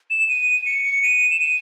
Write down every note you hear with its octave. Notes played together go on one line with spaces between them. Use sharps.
E7
D#7
C#7
C#7
D#7
E7
D#7